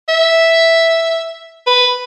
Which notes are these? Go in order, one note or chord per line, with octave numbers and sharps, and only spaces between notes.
E5
B4